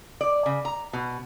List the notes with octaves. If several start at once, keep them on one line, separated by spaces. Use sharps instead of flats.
D5
C#3
A#5
B2